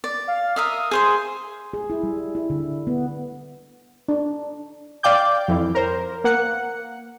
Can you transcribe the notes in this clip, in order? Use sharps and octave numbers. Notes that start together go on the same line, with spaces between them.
D5
F5
A#4 E5 F5 D#6
G#4 C5 C6
G#4
E4
G3
E4
D3
B3
D4
D5 F5 G5 D6 G6
F2 E3
A#4 C5
A#3 F#5 F#6 C#7